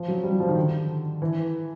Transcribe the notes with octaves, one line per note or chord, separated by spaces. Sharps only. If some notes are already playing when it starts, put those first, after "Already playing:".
Already playing: F3
F#3
G3
F#3
F3
D#3
D3
E3